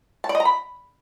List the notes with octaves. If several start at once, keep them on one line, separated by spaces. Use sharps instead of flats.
A5
D5
D#5
A#5
B5